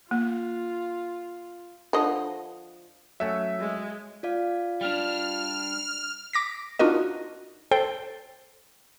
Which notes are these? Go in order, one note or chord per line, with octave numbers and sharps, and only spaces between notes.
A#3 F4
D3 F3 D#5
F#3 A3 C#4 E5
G#3
F4 D5 F5
G3 D4 F6
D6 A#6 B6
D4 D#4 F4 F#4 A#4 D#5
A4 C5 G5